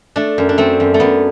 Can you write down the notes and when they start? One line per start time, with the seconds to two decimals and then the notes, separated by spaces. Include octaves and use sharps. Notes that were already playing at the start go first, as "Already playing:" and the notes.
0.16 A3 D4
0.38 F#2
0.49 D4
0.58 A3 C4
0.80 F#2
0.94 A3
1.00 F#2 B3